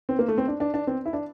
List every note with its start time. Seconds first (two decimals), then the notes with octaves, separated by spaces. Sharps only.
0.09 C4
0.19 A#3
0.28 A3
0.38 C4
0.48 D4
0.60 D4
0.74 D4
0.87 C4
1.06 E4
1.13 D4